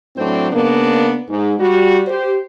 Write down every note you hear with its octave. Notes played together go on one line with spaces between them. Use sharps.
A2 F#3 C4 D4 C5
C#3 A#3 B3 D4 A#4
G#2
G3 F#4
G4 C5